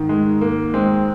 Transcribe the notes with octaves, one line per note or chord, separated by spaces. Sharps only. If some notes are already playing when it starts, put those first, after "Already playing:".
Already playing: G#2 D#3
G#3
A#3
G#3 C4